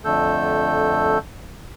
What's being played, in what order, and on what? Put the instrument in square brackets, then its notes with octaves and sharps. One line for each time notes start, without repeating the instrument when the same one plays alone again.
[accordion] F2 D3 A3 A4 E6 G6